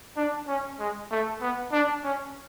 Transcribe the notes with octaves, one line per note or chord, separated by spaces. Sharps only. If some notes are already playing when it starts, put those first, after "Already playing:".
D4
C#4
G#3
A3
B3
D4
C#4